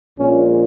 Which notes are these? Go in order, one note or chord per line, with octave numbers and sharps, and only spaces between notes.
A#1 A#2 G#3 C#4